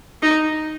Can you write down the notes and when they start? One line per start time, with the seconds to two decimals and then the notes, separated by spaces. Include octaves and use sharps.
0.22 D#4